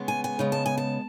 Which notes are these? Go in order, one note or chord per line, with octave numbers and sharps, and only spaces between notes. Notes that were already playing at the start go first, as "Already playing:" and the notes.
Already playing: C#3 G#3 B3
G#5
G#5
C#3 G#3 B3
A5
G#5
A5